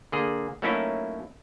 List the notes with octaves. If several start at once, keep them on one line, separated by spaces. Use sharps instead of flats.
D3 A#3 G#4
F#3 A3 A#3 C#4 D#4 E4